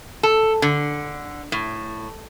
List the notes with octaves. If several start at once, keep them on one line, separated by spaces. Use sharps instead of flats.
A4
D3
A2